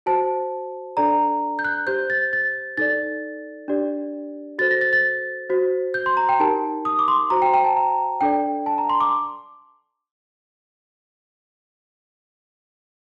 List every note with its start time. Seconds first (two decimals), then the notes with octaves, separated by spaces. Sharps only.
0.06 F#4 C5 A5
0.97 D4 A4 D5 A#5
1.59 G6
1.65 F#6
1.87 G4 C5 G6
2.10 A6
2.33 A6
2.77 D#4 A4 D5 A6
3.68 D4 G4 D5
4.59 F#4 A4 C5 A6
4.71 A#6
4.81 A6
4.93 A6
5.50 F#4 C5
5.94 G6
6.06 C6
6.17 A#5
6.29 G5
6.40 D#4 G4 A#4 A5
6.85 D#6
6.99 D6
7.08 C6
7.30 F#4 C5 A#5
7.42 G5
7.54 G5
7.64 A5
7.76 A#5
8.21 D4 A4 D5 G5
8.66 A5
8.78 A#5
8.90 C6
9.00 D6